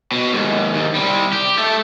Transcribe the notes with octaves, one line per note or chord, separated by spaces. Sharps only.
B2
D#2 G#2
D#2
C3 G3
G4
A3 A4